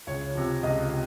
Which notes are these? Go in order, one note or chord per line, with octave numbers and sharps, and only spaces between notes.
C#2 C#5
C3 F3
C#2 D#5
C3